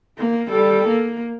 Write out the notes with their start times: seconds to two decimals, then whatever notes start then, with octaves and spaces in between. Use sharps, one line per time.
0.18 A#3
0.50 G3 A4
0.88 A#3